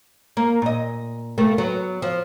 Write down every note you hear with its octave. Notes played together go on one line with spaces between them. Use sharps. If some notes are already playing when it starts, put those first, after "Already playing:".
A#3
A#2 D#5
C3 A3 A#3
F#3 B3
F3